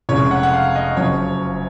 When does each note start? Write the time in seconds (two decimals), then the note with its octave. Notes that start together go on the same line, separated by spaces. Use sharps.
0.09 F1 F2 C#3 G#3 C#4 C#5
0.31 F#5
0.43 F#5
0.53 F5
0.76 D#5
0.97 F#1 F#2 C#3 F3 C#5